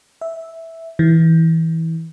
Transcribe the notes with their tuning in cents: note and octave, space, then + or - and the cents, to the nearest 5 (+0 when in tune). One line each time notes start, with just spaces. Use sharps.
E5 -5
E3 -20